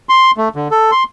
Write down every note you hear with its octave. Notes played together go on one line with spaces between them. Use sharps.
C6
A3
D3
A4
C6